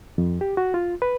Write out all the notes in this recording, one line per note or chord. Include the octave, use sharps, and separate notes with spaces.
F2
G4
F#4
F4
B4